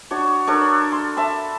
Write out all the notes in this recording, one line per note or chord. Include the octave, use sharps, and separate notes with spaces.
D4 F#4 C#5
D4 A4 A#4 C#5
C6
E5 A5 B5